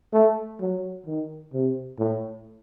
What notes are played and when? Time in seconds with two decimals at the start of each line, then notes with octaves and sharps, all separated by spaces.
0.13 A3
0.60 F#3
1.07 D#3
1.53 C3
1.99 A2